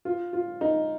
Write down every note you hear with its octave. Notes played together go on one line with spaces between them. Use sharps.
F4
F4
D#4